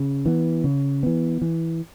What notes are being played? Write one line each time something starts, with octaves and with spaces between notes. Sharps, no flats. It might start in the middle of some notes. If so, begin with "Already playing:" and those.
Already playing: C#3
E3 B3
C#3
E3 B3
E3